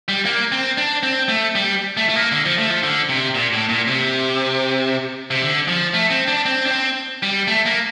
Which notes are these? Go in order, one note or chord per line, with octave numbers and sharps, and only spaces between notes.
G3
A#3
C4
D4
C4
A3
G3
A3
A3
A#3
D3
F3
A3
F3
D3
C3
A#2
A2
A#2
C3
C3
D3
F3
A3
C4
D4
C4
D4
C4
G3
A3
A#3